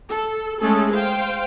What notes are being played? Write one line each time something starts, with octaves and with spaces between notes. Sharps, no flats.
A4
G#3 A3 C#4 G#4 A4
C5 F5 G5